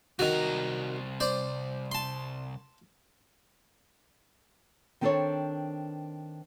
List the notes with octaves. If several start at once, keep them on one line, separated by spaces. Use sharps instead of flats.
C2 D#3 F#4 A#5
C5 D5
A5 C6
D#3 C4 D4 A4 C5 C#5